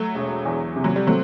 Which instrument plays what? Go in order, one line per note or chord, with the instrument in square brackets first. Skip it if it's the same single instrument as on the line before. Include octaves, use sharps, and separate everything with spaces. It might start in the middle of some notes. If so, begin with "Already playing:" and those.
Already playing: [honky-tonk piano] F#3 A3
[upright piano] E1
E2
C3
[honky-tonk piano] F#3
G3
[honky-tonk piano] F#3 A3 [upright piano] C4